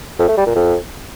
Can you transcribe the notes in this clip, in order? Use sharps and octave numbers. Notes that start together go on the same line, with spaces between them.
F2
A3
G3
A#2
F2